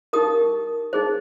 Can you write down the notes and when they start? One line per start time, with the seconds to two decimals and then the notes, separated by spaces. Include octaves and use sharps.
0.13 D#4 G4 A#4 D#6
0.93 D#4 G#4 C5